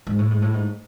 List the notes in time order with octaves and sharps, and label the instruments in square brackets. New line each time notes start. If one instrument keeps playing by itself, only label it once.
[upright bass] G#2
A2
G#2
A2
G#2